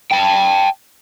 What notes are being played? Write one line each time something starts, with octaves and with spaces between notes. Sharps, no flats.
G5 A5